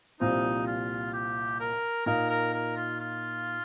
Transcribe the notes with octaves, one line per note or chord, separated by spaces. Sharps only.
C2 A#2 F3 C4 D#4
F4
G4
A#4
A#2 A#3 D#4 A#4
A#4
A#4
F4
F4